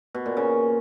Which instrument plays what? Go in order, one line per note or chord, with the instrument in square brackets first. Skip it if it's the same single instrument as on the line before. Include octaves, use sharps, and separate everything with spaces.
[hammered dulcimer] B2
A#2
C#3